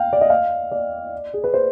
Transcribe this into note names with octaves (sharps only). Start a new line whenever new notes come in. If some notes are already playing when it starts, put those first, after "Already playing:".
Already playing: F5 G5
D5
D#5
F5
D5
G#4
B4
C5